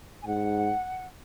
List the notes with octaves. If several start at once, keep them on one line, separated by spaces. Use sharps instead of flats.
G#5
G#2 F#5